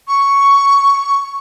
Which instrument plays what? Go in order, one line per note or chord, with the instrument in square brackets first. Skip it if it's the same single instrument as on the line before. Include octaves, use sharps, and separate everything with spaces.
[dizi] C#6